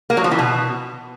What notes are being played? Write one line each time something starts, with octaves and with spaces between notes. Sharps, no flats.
A#3
F#3
F3
E3
B2